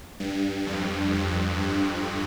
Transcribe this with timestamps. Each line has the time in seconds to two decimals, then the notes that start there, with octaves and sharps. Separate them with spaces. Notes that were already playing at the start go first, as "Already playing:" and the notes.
0.20 G2
0.66 F2
1.13 F2
1.60 G2